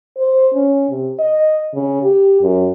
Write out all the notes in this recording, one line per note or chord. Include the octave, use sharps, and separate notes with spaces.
C5
C#4
C3
D#5
C#3
G4
F#2